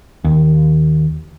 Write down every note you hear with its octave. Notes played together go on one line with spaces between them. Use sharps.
D#2